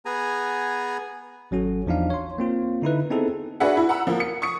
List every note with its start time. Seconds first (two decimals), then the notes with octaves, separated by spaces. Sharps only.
0.05 B3 G#4 G#5 A#5
1.51 G#1 F#3 C#4 F#4 A4
1.86 E2 F3 D4 D#4 F5
2.10 C#5 C6
2.38 A#3 C4 F4
2.82 D3 D#4 E4 B4
3.10 B3 C4 D#4 E4 G#4 A4
3.60 D4 F#4 G#4 B4 E5 F#5
3.77 E4
3.89 F#5 A#5 B5 E6
4.07 F3 A#3
4.20 C#7
4.42 C#6 D#6 C#7